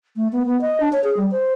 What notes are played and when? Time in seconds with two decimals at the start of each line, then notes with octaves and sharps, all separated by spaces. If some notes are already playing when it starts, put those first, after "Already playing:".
0.16 A3
0.32 B3
0.46 B3
0.61 D#5
0.80 D4
0.93 C#5
1.04 G#4
1.17 G3
1.31 C5